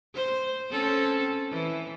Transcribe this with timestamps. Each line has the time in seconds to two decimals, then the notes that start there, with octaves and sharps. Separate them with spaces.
0.15 C5
0.71 C4 C#4 A4
1.51 E3